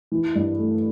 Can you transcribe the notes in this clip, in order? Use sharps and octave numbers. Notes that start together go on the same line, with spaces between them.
E3
G2
A3